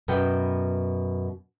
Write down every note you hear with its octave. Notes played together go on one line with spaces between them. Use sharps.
F#2 B2 B3 G5